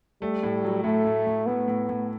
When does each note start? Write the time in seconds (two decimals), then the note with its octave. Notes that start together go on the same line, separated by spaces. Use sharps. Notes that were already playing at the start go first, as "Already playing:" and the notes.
0.22 G3 A3
0.43 A2
0.64 F#3
0.84 A2 A3
1.05 A2
1.27 A2
1.47 A2 B3
1.68 A2
1.89 A2